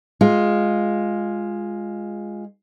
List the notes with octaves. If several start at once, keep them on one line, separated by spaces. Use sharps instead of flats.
G#3 F4